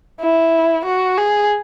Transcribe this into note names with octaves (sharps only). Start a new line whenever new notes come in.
E4
F#4
G#4